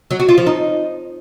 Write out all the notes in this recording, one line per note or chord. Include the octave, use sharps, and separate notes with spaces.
F#3
F#4
F4
F3
D#4